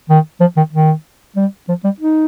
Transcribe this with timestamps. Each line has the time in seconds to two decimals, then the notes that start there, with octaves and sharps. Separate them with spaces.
0.09 D#3
0.40 F3
0.57 D#3
0.73 D#3
1.36 G3
1.68 F3
1.84 G3
2.00 D#4